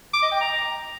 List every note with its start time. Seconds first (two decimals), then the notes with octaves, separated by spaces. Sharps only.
0.14 D6
0.23 D#5
0.32 G5
0.41 A#5